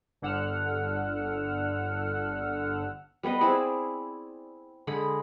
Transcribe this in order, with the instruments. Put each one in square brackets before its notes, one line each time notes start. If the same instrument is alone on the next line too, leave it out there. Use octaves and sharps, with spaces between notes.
[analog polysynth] G1 D3 F#5 E6 F6
[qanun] G3 B3 B4 D#5
C4 E4 G#4 D5
D3 G#3 G#4 B5